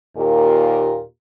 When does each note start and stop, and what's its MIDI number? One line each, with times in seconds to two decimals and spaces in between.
0.16 1.01 39
0.16 1.01 46
0.16 1.01 65
0.16 1.01 67
0.16 1.01 70